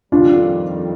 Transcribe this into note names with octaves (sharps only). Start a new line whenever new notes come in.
F2 D#3 G3 D4 F4